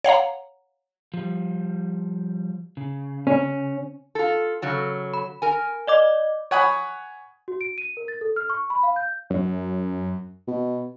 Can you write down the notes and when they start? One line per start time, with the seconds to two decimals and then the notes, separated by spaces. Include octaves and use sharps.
0.04 C#5 F5 F#5 A#5
1.14 F3 G3
2.77 C#3
3.27 C#4
4.15 F4 A4
4.62 C#3 F#3 A4
5.14 B5
5.42 A#4 G#5
5.87 D5 D#5 D6
6.51 C#5 F#5 G#5 B5 D#6
7.48 F#4
7.61 D7
7.78 D#7
7.97 A#4
8.08 A6
8.21 A4
8.36 F6
8.50 C#6
8.70 B5
8.83 F5
8.96 G6
9.30 F#2
10.47 B2